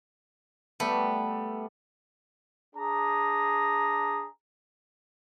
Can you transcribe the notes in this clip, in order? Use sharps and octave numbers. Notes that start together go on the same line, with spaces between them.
G3 A3 B3
D4 G#4 A#5